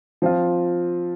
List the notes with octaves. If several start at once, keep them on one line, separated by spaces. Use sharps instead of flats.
F3 C4 F4